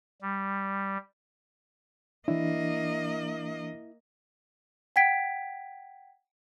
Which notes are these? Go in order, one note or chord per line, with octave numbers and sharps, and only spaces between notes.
G3
E3 A#3 D4 E4 D#5
F#5 G5 G#6 B6 D7